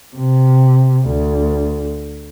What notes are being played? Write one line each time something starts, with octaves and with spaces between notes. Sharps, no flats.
C3
D2